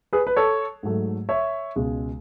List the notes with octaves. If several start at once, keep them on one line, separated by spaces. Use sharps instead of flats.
G#4 B4
B4
A4 C#5
G#2 F#3 A3
C#5 E5
C#2 B2 G#3